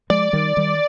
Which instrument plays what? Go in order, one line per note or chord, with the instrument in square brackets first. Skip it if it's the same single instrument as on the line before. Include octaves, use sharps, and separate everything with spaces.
[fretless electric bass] F3 G#3 [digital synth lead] D5
[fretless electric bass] D#3 G3
D#3 G3